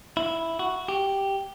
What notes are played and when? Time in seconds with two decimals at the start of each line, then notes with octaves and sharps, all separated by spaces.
0.17 E4
0.59 F#4
0.88 G4